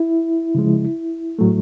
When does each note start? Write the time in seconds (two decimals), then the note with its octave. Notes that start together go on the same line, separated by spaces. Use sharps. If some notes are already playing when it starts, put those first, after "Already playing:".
Already playing: E4
0.55 C#3 F3 G#3
1.39 A2 F#3 A3